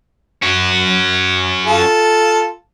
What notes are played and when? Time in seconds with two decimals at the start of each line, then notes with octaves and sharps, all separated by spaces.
0.42 C#4 F#4
1.66 F4 A4